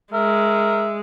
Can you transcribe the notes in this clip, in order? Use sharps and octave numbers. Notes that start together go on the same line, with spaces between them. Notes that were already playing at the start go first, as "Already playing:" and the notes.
G#3 A#4 E5